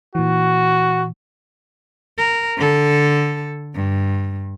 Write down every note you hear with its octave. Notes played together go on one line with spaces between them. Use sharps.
A#2 E3 F#4
A#4
D3 A4
G2